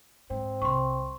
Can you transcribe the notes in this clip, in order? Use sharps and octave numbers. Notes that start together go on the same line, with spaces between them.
G#2 C4
C2 C6 C#6